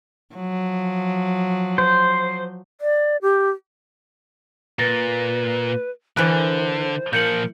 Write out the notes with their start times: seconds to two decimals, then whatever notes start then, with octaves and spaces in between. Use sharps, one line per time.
0.35 F3 F#3
1.78 C5
2.81 D5
3.22 G4
4.79 A#2 B4 A6 A#6
6.17 D3 E3 A#4 C5 F#6
7.13 A#2 F3 A#4 G6 C#7 F#7